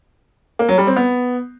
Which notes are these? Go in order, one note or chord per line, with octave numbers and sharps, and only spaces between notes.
A#3
F#3
G3
C4
B3